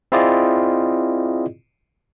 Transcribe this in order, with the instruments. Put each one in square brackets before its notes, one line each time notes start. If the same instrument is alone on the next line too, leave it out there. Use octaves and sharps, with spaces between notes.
[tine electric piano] C4 E4 F4 G#4 D5 D#5